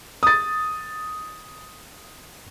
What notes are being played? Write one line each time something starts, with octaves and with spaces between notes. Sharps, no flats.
D#6 A6